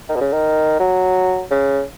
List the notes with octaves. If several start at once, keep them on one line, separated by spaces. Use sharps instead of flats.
D#3
B2
C#3
D#3
F#3
C#3